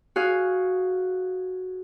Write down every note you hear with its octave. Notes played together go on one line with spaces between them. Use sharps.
F#4 G#4 F5